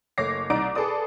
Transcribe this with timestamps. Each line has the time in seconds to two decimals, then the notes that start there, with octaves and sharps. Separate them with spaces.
0.18 F#1 A3 C#5 D6 A#6 C7
0.50 C2 D#4 D5 A#5 D6 D7
0.75 G#4 A4 B4 D5 D#6